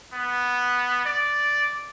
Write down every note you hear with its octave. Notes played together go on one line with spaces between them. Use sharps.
B3
D5